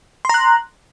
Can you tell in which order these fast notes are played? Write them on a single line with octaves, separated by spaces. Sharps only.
C6 A#5 F#6